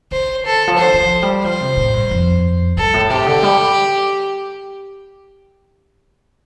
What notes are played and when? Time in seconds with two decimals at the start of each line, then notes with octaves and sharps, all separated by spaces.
0.11 D3 C5
0.45 A4
0.68 F3
0.78 D3 C5
0.94 D3
1.00 F3
1.23 G3
1.44 F3 C5
1.61 C3
1.77 A2
1.94 G2
2.11 F2
2.77 G2 A4
2.94 A2
3.10 C3 G4
3.26 D3
3.43 G3